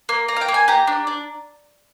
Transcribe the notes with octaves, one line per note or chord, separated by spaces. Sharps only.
A#3
A#3 A#5
F5
G5
A#3
G#5
G4 A#5
D4
D4